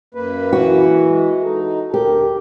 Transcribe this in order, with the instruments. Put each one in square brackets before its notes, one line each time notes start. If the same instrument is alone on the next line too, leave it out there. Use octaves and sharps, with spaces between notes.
[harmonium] F#2 A#3 B4
[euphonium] E3 [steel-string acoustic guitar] F#4
[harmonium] G#3
[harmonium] D#4 [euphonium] A4
[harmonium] D2 [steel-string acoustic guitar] G4 [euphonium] A#4